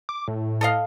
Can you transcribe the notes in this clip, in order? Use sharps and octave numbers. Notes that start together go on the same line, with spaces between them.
D6
A2
A4 D#5 F5